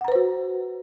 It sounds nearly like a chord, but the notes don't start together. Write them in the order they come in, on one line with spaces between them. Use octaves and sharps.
F#5 A#5 B4 C5 F#4